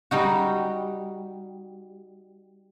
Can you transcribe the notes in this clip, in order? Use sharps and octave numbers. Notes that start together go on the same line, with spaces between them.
G3 D#4 F#4